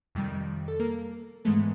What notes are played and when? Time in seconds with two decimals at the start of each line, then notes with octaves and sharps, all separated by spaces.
0.15 F2 C3 D#3 G3
0.68 A4
0.80 A#3 A#4
1.45 G#2 E3 G#3 A3 B3 A4